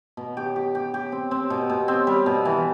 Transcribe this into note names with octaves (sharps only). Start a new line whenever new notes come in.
B2
G4
G4
G4
G4
C4
C4
B2
B2
C4
G3
B2
E3